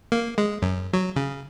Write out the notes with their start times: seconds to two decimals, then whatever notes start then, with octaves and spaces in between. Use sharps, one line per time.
0.12 A#3
0.38 G#3
0.62 F#2
0.93 F#3
1.16 C#3